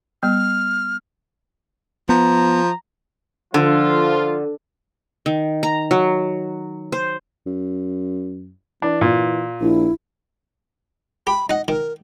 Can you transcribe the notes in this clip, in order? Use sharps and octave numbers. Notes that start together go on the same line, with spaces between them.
G3 B3 F6
F3 B3 A#5
D3 F3 F4
D#3
A#5
F#3
C5
F#2
E3 D4
A#2
A#1 E4
G4 B5
D#4 D#5 F#5
D#3 A#4